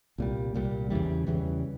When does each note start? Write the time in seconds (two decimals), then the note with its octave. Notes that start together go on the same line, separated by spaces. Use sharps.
0.18 C2 A#2 G3
0.54 C2 A#2 G3
0.90 E2 C#3 E3 G3
1.27 E2 C#3 E3 G3